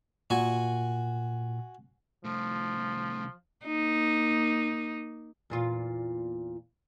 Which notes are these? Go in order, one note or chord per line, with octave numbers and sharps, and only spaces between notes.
A#2 F#4 G#5
C2 F3 A3
A#3 D#4
E2 A#2 F4